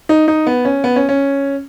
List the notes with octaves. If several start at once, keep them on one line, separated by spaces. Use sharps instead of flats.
D#4
D#4
B3
C#4
B3
C#4
C#4